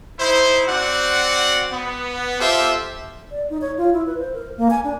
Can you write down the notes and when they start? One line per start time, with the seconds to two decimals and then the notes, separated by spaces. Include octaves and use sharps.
0.20 D#4 E4 C5
0.67 C4 F#4 D5 F#5
1.73 B3
2.40 F4 G4 A4 C5 E5
3.31 D5
3.50 D#4
3.61 C#5
3.78 F4
3.93 E4
4.07 B4
4.19 C5
4.34 A#4
4.57 A#3
4.71 G#5
4.84 D4